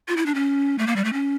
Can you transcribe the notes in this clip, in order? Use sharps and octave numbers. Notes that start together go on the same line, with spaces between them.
F4
E4
D4
C#4
A3
A#3
G3
A3
C#4